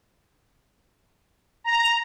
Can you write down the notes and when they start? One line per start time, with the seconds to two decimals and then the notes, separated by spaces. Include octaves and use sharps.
1.64 A#5